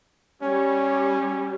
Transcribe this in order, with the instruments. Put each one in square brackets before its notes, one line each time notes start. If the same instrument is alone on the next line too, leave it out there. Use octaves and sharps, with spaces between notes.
[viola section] G3 [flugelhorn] C#4 [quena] C#5